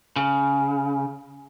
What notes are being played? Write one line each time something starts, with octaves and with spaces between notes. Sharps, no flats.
C#3